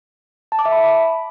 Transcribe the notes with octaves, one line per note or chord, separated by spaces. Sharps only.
A5
D6
E5
B5